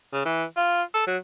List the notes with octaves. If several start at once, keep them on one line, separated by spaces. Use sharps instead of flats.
C#3
E3
F4
A4
F#3